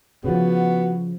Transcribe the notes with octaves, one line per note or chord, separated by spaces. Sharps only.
C#3 F3 B3 F#4